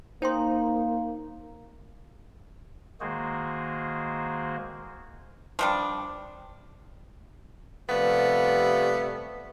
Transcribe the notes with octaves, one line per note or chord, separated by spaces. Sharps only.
A#3 D#4 C5 G5 C6
D#3 G#3 A#3 F#4 G#4 C5
F3 G3 D4
C3 F3 G3 A3 B3